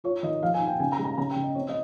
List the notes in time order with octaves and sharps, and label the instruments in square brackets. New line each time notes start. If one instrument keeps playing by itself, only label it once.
[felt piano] F4 C#5
D#3 D#5
F3 F5
G#5
D#4
G5
C#3 G#5
A#5
G#3
A#5
C#3 A#5
G5
C#3
D#5
C4 C#5
D#5